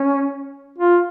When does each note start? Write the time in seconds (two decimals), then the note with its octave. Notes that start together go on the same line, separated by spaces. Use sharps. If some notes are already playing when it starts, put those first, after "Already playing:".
Already playing: C#4
0.78 F4